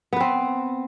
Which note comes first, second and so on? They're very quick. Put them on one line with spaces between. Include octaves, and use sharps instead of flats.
B3 B4 C4